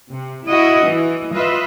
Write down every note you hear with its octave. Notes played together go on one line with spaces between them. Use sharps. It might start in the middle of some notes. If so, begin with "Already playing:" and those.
C3
E4 F#4 D#5
E3
F4 B4 D#5 E5